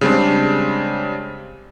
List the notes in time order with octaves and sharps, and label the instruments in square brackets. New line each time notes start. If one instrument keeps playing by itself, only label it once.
[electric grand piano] C#3 G3 G#3 C4 D4